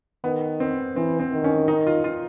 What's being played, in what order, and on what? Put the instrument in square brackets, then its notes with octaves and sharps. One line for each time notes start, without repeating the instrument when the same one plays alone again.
[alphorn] D#3 [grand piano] B3
[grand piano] C4
[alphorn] E3 [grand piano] C4
[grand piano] C4
[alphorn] D#3
[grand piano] C#4
D#4
F4
F4